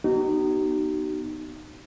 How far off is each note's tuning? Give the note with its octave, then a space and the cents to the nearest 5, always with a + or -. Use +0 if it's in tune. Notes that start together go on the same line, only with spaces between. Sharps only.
B3 +0 D#4 -20 F#4 +45